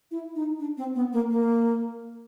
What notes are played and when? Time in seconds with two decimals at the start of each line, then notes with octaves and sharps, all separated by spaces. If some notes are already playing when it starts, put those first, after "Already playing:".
0.11 E4
0.35 D#4
0.60 D4
0.77 C4
0.95 B3
1.13 A#3
1.30 A#3